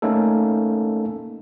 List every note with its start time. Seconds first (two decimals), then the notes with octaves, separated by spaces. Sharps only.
0.02 A3 A#3 C#4 D#4 A4